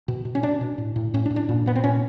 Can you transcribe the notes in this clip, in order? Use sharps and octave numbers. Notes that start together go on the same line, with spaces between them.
B2
B2
C#4
B2 D4
B2
A2
A2
A2 C#4
D4
A2
D4
A#2
A#2 B3
C4
A#2 C#4